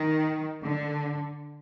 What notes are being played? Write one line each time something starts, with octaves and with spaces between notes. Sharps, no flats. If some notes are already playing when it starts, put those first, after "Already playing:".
Already playing: D#3
D3